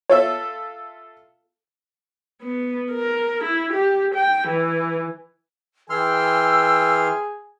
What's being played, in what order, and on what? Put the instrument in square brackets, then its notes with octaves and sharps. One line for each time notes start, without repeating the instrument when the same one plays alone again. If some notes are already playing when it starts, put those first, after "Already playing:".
[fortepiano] F4 A4 E5 [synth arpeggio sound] C#5
[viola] B3
A#4
E4
G4
G5
E3
[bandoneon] E3 C6 F6 [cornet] G#4 [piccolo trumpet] G5 [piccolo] E6